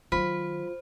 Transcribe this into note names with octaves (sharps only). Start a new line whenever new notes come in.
D#3 F#3 F4 C5 B5